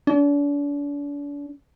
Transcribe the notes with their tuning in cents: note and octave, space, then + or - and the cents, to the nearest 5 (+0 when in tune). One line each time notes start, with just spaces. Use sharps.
D4 -40